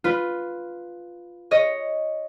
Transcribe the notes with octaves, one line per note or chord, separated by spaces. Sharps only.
F4 B4
C#5 D#5